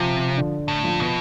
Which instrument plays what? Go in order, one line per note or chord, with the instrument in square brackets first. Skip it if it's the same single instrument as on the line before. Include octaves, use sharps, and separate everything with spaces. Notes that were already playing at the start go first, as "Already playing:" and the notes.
Already playing: [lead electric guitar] C3 [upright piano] F3
[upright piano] D3
[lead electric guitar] A2
[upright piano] F3
[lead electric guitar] B2